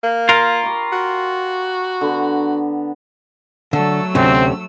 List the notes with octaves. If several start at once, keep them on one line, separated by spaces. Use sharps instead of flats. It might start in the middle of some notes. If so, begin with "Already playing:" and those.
A#3
F4 A#4
G4 B5 C#6
F#4
D3 B3 A#5
D3 F#3 A3 A4 E6
D2 C3 C4 C#4